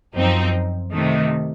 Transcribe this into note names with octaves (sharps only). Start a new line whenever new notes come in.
F#2 F3 C4 D#4
C3 D#3 A3